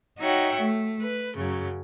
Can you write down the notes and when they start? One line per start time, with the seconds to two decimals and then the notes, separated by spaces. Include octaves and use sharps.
0.19 D#4 F#4 C#5 E5 F#5 G5
0.60 A3
1.01 B4
1.37 F#2 C#3 F#3